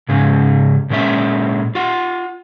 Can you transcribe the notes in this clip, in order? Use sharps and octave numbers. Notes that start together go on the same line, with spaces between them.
G#2 C#3 G#3
A#2 G#3 C#4 E5
F4 F#5